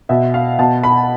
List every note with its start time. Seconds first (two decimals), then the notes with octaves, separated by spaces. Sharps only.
0.09 B2 E5
0.34 F5
0.59 B2 A5
0.84 B5